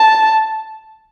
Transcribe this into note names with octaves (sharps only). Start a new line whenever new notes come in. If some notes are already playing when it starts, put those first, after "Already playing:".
Already playing: A5